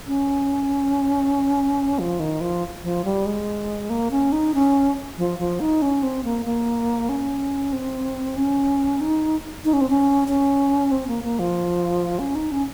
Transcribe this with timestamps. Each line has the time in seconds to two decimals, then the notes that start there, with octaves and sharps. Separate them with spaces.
0.07 C#4
1.99 F3
2.20 D#3
2.41 F3
2.83 F3
3.05 G3
3.26 G#3
3.90 A#3
4.11 C#4
4.32 D#4
4.54 C#4
5.18 F3
5.39 F3
5.60 D#4
5.82 C#4
6.03 C4
6.24 A#3
6.46 A#3
7.09 C#4
7.73 C4
8.37 C#4
9.01 D#4
9.65 D#4
9.73 C#4
9.81 C4
9.90 C#4
10.28 C#4
10.92 C4
11.08 A#3
11.24 A#3
11.39 F3
12.19 C#4
12.35 D#4
12.52 C#4